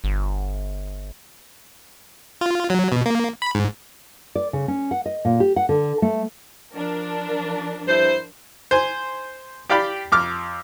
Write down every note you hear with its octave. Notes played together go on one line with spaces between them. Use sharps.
G1
F4
F#3
B2
A#3
B5
G#2
D5
C#3
C#4
F#5
D#5
A#2
G4
F#5
D3
A3
F3 D4 A#4
G2 E4 C5
C5 G#5
G4 D5 F5 G5 B5
F2 D6 F6